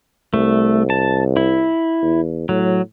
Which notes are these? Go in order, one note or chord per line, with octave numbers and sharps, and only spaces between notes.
C2 A3
A5
E4
E2
A2 F#3